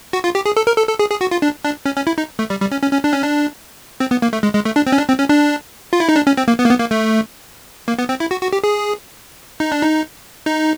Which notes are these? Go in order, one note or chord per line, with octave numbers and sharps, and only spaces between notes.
F#4
F4
G4
G#4
A4
A#4
A4
A4
G#4
G#4
F#4
F4
D4
D4
C#4
C#4
E4
D#4
A3
G3
G3
C#4
C#4
C#4
D4
C#4
D4
C4
B3
A#3
A3
G#3
G#3
A3
D4
C4
C#4
D4
C4
C#4
D4
F4
E4
D#4
D4
C#4
C4
A#3
B3
A#3
B3
A#3
A3
A#3
B3
C4
E4
F#4
F#4
G4
G#4
D#4
D4
D#4
D#4